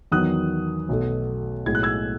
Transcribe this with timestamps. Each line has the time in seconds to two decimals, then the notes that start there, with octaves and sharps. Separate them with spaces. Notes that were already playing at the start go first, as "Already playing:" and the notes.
0.12 E2 D#3 F#3 B3 D#6 F#6
0.89 B1 B2 A3
1.66 B1 A2 G#3 G#6
1.75 F#6
1.83 E6 G#6